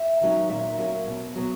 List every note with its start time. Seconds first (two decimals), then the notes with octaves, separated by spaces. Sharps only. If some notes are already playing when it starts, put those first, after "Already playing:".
Already playing: E5
0.21 D#3 F#3 C#4
0.49 A#2 E5
0.78 F#3 A#3 C#4
1.07 B2
1.35 F#3 B3